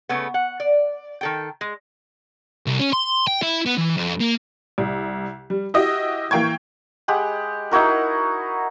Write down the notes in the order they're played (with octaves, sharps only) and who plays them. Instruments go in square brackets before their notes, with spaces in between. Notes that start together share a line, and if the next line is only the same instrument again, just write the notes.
[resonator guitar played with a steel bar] C#3 A3 B3
F#5
D5
D#3 A4 G5
G#3
[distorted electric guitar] C2
C#4
C6
G5
E4
B3
E3
F2
A#3
[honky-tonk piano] C2
G3
E4 F#4 G4 D#5
E3 A#3 G5 C#6 G#6
[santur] G#3 G4 F#5 B5
D#4 E4 F#4 A#4